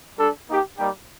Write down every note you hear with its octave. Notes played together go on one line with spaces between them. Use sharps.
G3 D4 A4
A#3 D#4 G4
G3 A#3 D#4 G4